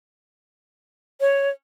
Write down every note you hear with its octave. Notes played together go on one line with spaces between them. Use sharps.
C#5